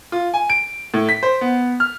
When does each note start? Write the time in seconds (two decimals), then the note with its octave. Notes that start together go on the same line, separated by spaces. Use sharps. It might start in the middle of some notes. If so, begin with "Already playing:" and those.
0.12 F4
0.34 G#5
0.50 D7
0.94 A2
1.09 B6
1.23 C5
1.41 B3
1.80 F6